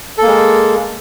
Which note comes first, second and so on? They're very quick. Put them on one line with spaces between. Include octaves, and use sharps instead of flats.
A4 A#3 G#3